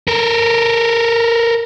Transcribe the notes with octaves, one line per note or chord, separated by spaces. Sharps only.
A4 A#4